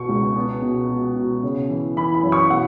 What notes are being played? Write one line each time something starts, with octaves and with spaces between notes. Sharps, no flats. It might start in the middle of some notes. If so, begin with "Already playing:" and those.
Already playing: B2 B3 C#6
C#2
B3
B2
B2
B2
C#3
E3
E3 B5
B5
F#2
C#6
B2 F#5